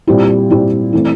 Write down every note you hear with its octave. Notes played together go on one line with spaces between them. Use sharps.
A#2 G3 C4 E4 G4
A#2 G3 C4 E4 G4
E3 A3 C4